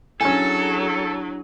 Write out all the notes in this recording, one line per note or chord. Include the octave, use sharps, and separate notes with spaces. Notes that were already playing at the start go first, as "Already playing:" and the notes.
F#3 C#4 D4 E4 G#4 A4 G#5